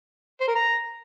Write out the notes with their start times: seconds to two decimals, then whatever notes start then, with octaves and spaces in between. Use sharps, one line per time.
0.40 C5
0.48 A#4
0.55 A#5